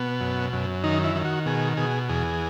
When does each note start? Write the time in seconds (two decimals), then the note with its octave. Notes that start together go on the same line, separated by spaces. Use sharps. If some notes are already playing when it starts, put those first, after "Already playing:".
Already playing: B2 B3
0.20 F#2
0.53 F#2
0.84 D#3 D#4
1.04 E4
1.15 D#3
1.25 F#4
1.46 B2 G#4
1.77 B2 G#4
2.09 E2 G#4